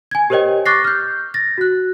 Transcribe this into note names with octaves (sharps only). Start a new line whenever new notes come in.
G#5 G#6
G4 A#4 C5 C#5 D#5 G5
C#6 D6 F#6 A6 A#6 C7
F6 G6
A6 A#6
F#4 F#6